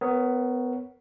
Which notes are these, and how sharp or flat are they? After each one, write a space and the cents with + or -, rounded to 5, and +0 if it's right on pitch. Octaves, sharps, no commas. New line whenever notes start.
B3 +20 A#4 +0 C#5 +0